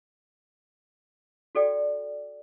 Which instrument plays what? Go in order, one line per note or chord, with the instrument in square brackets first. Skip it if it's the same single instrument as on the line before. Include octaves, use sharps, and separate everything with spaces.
[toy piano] F#4 A4 D5 G5